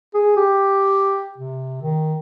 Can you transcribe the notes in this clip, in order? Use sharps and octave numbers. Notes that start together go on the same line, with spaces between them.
G#4
G4
C3
D#3